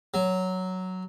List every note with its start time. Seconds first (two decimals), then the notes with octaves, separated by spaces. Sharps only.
0.14 F#3